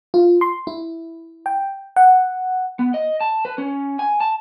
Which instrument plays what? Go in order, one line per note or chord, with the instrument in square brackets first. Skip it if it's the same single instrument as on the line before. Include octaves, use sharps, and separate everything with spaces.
[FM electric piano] F4
C6
E4
G5
F#5
[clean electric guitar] B3
D#5
A5
B4
C#4
G#5
A5